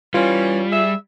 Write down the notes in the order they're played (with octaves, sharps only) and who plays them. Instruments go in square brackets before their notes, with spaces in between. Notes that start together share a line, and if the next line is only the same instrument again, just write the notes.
[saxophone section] E3 C#4 [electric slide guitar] G3 [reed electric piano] F4
[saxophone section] G#4 E5